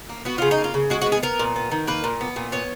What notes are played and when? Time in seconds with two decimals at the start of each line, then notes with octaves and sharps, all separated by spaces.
0.09 A#3
0.25 B3 F#4
0.38 C#3 F4
0.51 D#4
0.58 A#3
0.64 F4
0.74 C#3
0.90 G#3 F#4
1.02 F#4
1.06 B3
1.12 G#4
1.23 B3 A#4
1.39 A#2
1.56 B3
1.71 D#3
1.87 A#3 B4
2.04 A#2
2.21 B3
2.36 A#2
2.52 B3 C#5